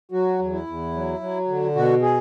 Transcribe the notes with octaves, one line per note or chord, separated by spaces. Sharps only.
F#3 F#4
E2
E4
E2
F#3
F#3
D3
B2 F#4
G#4